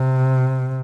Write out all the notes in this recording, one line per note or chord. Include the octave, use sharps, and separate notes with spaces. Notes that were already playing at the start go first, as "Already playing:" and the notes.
Already playing: C3